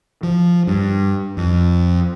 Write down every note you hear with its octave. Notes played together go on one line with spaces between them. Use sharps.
F3
G2
F2